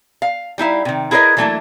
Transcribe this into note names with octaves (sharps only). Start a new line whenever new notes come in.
F5
G3 D#4 E4 F5
C3 D#3
E4 G#4 A#4 B4 C#5 D#5
E3 F#3 A3 A#3 D4 E4